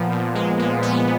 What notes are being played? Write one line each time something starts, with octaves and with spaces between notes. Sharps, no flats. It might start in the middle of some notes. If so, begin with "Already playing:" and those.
Already playing: A#2 F3 B3
A#2
G#3
A#2
B3